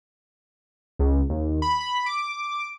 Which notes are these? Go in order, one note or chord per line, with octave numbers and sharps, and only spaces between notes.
C#2
D#2
B5
B5
D6